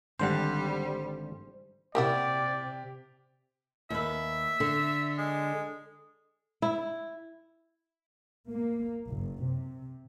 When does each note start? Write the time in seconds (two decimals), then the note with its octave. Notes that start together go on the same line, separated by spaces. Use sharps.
0.19 G#1 D3 G3 C5 F#5
1.95 C3 A#3 E4 F#4 G4 D5
3.90 D#2 B4 E5
4.60 D3
5.18 G#3
6.62 E4
8.49 A#3
9.10 F#1
9.44 C3